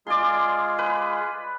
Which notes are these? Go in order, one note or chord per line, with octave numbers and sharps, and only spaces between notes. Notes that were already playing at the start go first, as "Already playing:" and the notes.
G#3 F4 G#4 D5 C6
B4